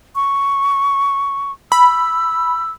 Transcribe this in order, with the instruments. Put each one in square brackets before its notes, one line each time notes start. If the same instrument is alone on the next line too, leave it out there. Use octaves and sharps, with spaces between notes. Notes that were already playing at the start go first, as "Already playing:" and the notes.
[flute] C#6
[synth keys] B5 [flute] E6